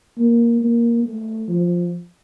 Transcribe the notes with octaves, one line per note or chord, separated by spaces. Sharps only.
A#3
A#3
A3
F3